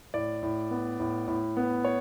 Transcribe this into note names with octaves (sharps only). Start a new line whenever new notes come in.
A2 D5
A2
B3
A2
A2
B3
C#5